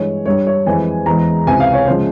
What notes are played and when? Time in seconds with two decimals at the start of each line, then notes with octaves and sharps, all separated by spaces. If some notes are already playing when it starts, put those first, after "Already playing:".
Already playing: G2 E3 G#3 C#5
0.25 G2 G3 C#5
0.47 C#5
0.66 F2 E3 G#3 G#5
1.06 E2 E3 G#3 A#5
1.47 C#2 C3 E3 G#5
1.60 F5
1.73 C#5
1.87 C#3 F3 G#3 C5